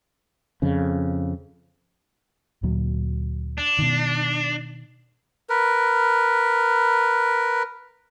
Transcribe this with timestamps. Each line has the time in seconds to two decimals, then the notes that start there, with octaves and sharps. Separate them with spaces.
0.62 F2 C#3
2.63 D2 A#2 F#3
3.58 D4
3.79 B2 D#3
5.50 A#4 B4